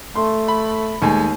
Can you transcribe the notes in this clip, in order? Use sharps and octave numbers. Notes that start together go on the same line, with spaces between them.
A3 C6
B5
D#2 G#3 A3 G#5